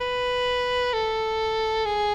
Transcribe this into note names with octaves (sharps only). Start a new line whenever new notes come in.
B4
A4
G#4